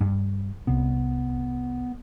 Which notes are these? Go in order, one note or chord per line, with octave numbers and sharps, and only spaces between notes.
G2
C2 C3 B3